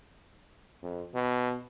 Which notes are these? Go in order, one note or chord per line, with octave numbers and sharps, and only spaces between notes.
F2
B2